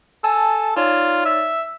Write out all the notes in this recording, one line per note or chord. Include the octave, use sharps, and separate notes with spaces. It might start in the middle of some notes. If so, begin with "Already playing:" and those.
A4 G#5 A5 E6
D#4 F4 C#5 D5
E5